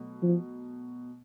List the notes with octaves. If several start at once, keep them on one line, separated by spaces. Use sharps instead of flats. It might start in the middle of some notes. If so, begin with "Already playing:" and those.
Already playing: B2 F#3 A3
F3